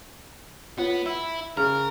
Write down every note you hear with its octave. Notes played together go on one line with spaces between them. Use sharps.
B3 F4 C#5 F#5
E4 E6
C#3 A#4 F6